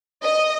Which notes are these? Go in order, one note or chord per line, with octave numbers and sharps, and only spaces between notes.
D#5